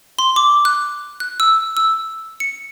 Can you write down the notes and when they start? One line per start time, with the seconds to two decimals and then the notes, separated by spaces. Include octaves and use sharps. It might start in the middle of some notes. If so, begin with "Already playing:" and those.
0.19 C6
0.36 D6
0.65 F#6
1.20 F#6
1.40 E6
1.77 E6
2.40 C#7